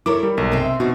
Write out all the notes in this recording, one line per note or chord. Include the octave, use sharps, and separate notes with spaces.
E4 A4 A#4 C#5 D6
G3
B1 A#4
C3 C4
E5
B2 C4 D#4 F#4